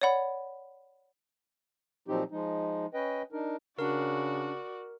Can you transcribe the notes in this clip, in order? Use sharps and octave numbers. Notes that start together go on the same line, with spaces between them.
C#5 D5 F#5 B5
A#2 F3 F#3 C4 D#4 G4
F3 G#3 D#4
C#4 B4 D#5 G5
D4 D#4 A#4
C#3 D4 F#4 A#4 D5